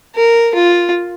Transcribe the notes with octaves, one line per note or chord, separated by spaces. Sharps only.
A#4
F4